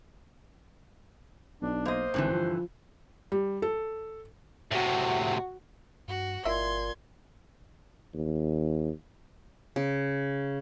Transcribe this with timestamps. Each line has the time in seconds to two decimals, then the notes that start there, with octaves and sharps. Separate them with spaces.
1.62 B1 D4
1.85 A#3 C5 D#5
2.14 G#1 G2 D3 E3
2.32 F3
3.32 G3
3.62 A4
4.71 A2 C3 F#4
6.08 G2 F#4
6.45 G1 A#2 E4 D#5 E5 C6 G#6
8.14 D#2
9.76 C#3